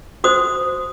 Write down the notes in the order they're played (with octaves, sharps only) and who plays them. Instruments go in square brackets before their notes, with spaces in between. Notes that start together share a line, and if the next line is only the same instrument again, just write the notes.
[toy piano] F#4 C5 D#6